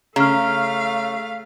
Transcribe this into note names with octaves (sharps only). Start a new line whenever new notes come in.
C#3 A3 F5 A#5 F6